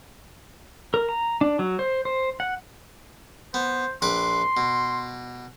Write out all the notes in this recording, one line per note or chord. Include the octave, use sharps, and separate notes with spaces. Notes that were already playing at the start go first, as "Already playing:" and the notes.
A#4
A#5
D4
F#3
C5
C5
F#5
B3 C5
A#1 B4 C6 D6
B2